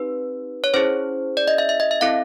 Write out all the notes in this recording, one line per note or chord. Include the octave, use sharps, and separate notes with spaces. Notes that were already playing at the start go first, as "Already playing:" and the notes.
Already playing: C4 D#4 G4 B4
C#5
C#4 E4 G#4 C5
D5
D#5
E5
E5
D#5
E5
C4 E4 A4 F5